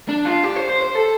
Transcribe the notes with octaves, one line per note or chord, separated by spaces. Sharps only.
D4
F4
G4
C5
C5
C5
A4